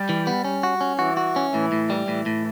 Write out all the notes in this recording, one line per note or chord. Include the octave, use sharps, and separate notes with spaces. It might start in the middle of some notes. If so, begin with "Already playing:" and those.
Already playing: G3
E3
B3
C#4
F#4
C#4
E3 F#4
F#4
C#4
A2 E3
A2
G3
A2 E3
A2